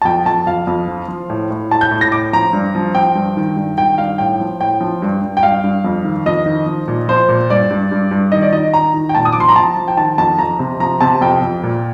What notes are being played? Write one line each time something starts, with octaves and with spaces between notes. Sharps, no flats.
A5
F2 G5
F2 A5
F2 F5
F2
F3
F3
A2
A2
A2 A5
G6
A2
A#6
A2 D6
F3 A#5
G2
F3
F3 G5
G2
D#3
G2
D#3 G5
G2 F5
A2 G5
F3
A2 G5
F3
G2
G2
G5
G2 F5
G2
F2
D#3
F2 D#5
D#3
F3
A#2
F3 C5
A#2
G2 D5
G2
G2
G2
D#3 D#5
D5
D#3 D#5
D#3 A#5
D#3
G5
A#2 A5
D#6
D6
F3 C6
A#5
F3 A5
F3
G5
D#3 A5
F2 A5
F2 A#5
C3
F3 A#5
C3 A5
F2 G5
F2
A#2